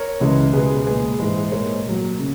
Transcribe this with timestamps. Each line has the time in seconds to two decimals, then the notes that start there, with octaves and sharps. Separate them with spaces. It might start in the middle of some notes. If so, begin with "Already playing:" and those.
Already playing: A#4 C#5
0.20 C#2 C#3 E3 G#3
0.53 C#2 B2 G#3 G#4 B4
0.86 A#2 G#3 G#4 B4
1.20 G#2 E3 G#3
1.52 A#2 G#3 A#4 C#5
1.85 A#2 F#3
2.19 C#3